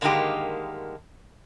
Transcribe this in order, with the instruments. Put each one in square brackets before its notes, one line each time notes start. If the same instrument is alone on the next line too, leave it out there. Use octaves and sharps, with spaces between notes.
[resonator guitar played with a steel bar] G2 D3 D#3 G#3 A#3 G4